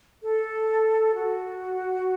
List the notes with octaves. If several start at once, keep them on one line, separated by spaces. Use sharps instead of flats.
A4
F#4